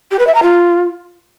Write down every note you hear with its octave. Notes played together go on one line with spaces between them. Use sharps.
G4
B4
E5
A#5
F4